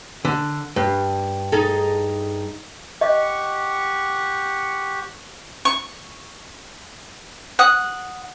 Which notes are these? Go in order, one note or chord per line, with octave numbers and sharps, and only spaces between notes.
D3
G2
D#4 G#4 A4
G4 D#5 F#5 C#6
C#6
F#5 D#6